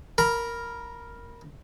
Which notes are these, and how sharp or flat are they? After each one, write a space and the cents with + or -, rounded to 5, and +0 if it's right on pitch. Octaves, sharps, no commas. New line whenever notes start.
A#4 +0 B5 -20